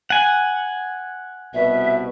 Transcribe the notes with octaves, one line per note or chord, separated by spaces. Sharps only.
F#5 G#5
C2 B2 B4 E5